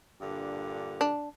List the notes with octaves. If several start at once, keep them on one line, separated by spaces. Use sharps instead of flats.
G2 A#2 D3
D4